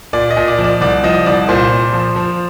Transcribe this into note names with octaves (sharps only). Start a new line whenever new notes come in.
A#2 D5
D#5
A#2
D5
F3
D5
C2 D5
F3 D#5
C2 D5
A#2 C5
A#2
F3
F3